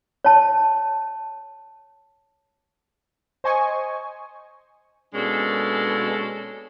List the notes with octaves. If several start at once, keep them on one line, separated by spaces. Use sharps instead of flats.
C#5 A5
C5 D#5 G#5 C#6
B2 G#3 A#3 C#4 D4 A4